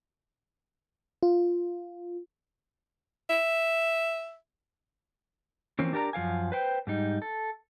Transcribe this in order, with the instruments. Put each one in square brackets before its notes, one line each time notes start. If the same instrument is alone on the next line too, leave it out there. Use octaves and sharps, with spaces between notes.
[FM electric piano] F4
[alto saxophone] E5
[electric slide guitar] E3 F3 A#3 C4 C#4
D4 G4 A#4 D5 A#5
F#2 F3 A#4 F5 G#5
B4 C5 G5
G#2 G3 D#4
A4